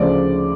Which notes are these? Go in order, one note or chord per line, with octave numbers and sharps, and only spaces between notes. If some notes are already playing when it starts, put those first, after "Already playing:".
Already playing: D2 C#3 F3 D5